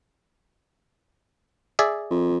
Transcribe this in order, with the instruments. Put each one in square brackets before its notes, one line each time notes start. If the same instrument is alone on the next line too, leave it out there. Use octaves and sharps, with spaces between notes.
[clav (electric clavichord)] G#4 D5 E5
[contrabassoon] F2